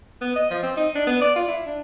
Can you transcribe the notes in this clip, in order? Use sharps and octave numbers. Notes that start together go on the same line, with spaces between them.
B3
D#5
F3
C4
D#4
D4
B3
D5
F4
E4
D4